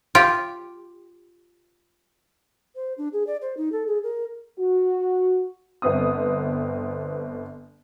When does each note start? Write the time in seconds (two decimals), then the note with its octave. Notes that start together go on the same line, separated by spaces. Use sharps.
0.15 F4 G4
2.75 C5
2.98 D4
3.13 G#4
3.27 D5
3.41 C5
3.57 D#4
3.72 A4
3.87 G#4
4.04 A#4
4.59 F#4
5.82 G1 B3 C4 D#6